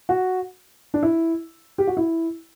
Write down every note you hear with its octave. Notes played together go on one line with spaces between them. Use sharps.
F#4
D4
E4
G4
F#4
E4